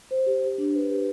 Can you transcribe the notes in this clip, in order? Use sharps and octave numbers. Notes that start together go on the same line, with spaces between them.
C5
G4
G4
D4
B4
G4